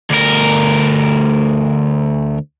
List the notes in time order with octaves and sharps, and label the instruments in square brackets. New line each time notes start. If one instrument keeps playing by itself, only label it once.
[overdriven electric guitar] D2 A#4